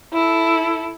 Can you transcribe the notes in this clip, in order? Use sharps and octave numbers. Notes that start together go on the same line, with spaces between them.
E4 A4